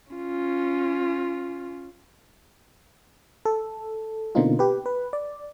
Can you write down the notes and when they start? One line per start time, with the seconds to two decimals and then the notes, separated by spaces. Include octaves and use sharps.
0.12 C#4 F4
3.45 A4
4.35 B2 D3 A#3 C4 D#4 F4
4.59 G4 B4
4.86 B4
5.13 D5